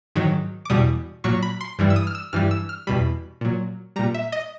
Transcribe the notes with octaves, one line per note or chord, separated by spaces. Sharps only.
G#2 D#3 F#3
D6
E2 B2 G3 D#6
A#2 F#3 C#6
B5
C6
G2 E3 G3
E6
D#6
F6
E6
G2 E3 G3 F6
E6
F6
E2 B2 G3 B5
A#2 F#3
A#2 G3 A#5
E5
D#5